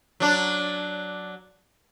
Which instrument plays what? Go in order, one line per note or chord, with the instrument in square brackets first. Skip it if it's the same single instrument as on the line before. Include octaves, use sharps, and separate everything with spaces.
[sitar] F#3 D4